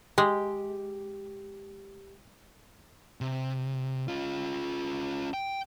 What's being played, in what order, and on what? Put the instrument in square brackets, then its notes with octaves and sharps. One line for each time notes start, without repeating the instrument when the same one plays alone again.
[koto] G#3 [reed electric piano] G4
[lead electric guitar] C3
C#4 F4
G5